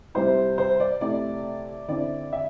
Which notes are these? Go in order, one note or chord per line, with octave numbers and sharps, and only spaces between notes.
C3 G3 E4 C5
C5
D5
C3 A3 E4 D5
D3 C4 E4 D5
E5